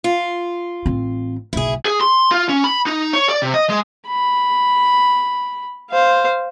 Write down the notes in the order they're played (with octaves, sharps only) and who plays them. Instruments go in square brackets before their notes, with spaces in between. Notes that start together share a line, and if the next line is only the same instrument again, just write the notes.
[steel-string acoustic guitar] F4
[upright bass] A1 C4
[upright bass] F#1 B1 [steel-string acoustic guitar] E4 G#4
[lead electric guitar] G#4
C6
F4
C#4
B5
D#4
C#5
D5
C3
D#5
G#3
[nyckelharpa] B5
C5 F5